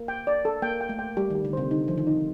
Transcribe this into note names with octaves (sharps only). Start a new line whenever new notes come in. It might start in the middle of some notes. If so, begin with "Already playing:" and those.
Already playing: A#3
G5
D5
A4
A#3 G5
G5
A3
G5
G3 G4
D#3
G4
D3
C3 C5
D3 D#4
F3 C5
D#3
D#4